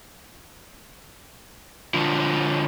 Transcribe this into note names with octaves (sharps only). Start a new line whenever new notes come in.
D3 F3